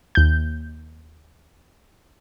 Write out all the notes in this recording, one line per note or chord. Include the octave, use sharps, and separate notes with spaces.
D#2 G6